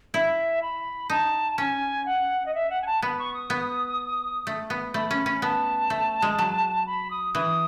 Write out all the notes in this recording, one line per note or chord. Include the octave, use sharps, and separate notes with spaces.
E4 E5
B5
D#4 A5
C#4 G#5
F#5
D#5
E5
F#5
G#5
A5
B3 B5
C#6
D#6
B3
A3
B3
A3 B5
C#4
C#4
B3 A5
A3
G#3
F#3
B5
D#6
E3 D#6